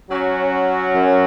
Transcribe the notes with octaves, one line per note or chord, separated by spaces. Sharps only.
F#3 C#4 F#4
F#2